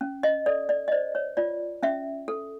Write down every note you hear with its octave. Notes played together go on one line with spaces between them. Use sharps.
C#4
D#5
A4 D5
D5
D#5
C5 D5
C#5
F4 D5
C#4 E5
A4